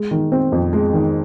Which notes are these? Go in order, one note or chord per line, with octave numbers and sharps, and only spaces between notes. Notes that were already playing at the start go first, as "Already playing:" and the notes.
Already playing: G#3
D#3
C4
F2
G#3
D#3